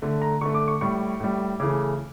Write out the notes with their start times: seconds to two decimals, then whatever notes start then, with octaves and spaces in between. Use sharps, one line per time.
0.02 D3 A3
0.22 A#5
0.41 D3 A3 C#6
0.54 D6
0.68 C#6
0.81 A2 G3 C#6
1.20 A2 G3
1.60 C#3 E3 A3 D6